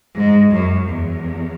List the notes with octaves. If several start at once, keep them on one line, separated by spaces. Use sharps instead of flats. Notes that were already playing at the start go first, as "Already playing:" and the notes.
G#2
F#2
E2